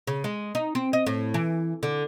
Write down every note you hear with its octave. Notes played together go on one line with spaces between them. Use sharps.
C#3
G#3
D#4
C4
D#5
A2
E3
D3